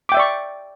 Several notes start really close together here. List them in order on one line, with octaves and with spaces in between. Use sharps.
D6 G5 E5 D5 C#6